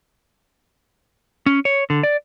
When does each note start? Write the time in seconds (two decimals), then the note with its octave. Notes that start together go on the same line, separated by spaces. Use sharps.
1.46 C#4
1.65 C#5
1.90 D3
2.03 D5